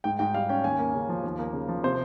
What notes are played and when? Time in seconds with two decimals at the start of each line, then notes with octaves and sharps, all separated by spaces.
0.04 G#2 G5
0.19 G#2 G5
0.34 G3 F5
0.49 C#4 G5
0.64 D#2 G#5
0.79 A#3
0.94 C#3
1.09 F3
1.23 D#2
1.39 A#3
1.53 C#3
1.69 F3
1.83 C3 C5